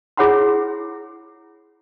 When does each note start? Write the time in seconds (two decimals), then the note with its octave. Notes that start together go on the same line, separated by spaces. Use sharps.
0.17 E4 G#4 C#5 F#5 B5 C6